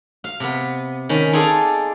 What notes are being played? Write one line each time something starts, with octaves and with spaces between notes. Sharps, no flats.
F5
C3 B3
D#3 C#4 B5
D#4 F4 G#4 A4 D5